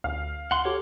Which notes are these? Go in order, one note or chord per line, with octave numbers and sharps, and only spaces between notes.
D2 F5
D2 F#5 C6
F#4 G4 A4 C#5 D6